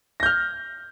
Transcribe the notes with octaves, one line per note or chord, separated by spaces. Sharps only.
F6 G6 A#6